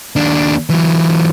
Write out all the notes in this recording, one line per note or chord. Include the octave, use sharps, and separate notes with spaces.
D#2 D4
E3 F#3